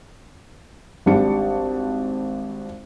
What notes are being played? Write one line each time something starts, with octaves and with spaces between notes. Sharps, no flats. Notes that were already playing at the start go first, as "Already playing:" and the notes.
G#1 G3 D4 A5 C#7